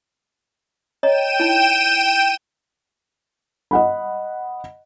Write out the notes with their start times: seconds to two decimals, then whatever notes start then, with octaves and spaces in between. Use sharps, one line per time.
1.03 C#5 D#5 G5 A#5 D#7 E7
1.40 D#4 E4
3.71 D#5 F#5 B5